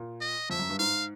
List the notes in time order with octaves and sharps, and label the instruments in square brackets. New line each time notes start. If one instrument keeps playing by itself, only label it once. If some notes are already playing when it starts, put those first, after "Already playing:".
Already playing: [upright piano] A#2
[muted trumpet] D#5
[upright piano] F2 [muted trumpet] E5
[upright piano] F#2
G2
[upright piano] G#2 [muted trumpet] F5